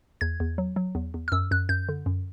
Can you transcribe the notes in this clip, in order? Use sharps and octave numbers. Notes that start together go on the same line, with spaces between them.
E2 G#6
E2
F#3
F#3
E2
E2
F6
F#2 E6
F#2 F#6
F#2 G6
D3
F#2